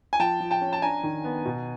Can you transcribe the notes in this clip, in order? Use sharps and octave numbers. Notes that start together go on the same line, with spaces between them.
G#5
F3 G5 A5
F3
G5 A5
C#4
A5
D4 G#5 A#5
D#3
B3
B2